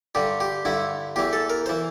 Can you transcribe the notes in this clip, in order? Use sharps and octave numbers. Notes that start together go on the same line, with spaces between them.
G2 D3 G4
G4
G2 D3 E4
E2 E3 G4
A4
A#4
E3 C5